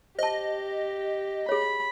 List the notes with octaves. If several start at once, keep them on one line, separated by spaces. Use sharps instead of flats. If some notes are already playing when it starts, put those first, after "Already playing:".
G4 C5 D#5 A5
G#4 C#5 B5